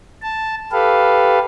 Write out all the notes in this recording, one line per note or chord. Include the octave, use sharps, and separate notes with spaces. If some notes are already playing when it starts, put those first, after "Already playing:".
A5
G4 A4 B4 F5